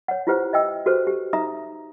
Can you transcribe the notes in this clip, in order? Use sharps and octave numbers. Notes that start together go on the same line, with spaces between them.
C#5 F#5
E4 F4 G4 B4 C5 F#5
D#5 E5 G5 E6
F#4 G4 A4 B4 C5
G4
D#4 E5 A#5 D#6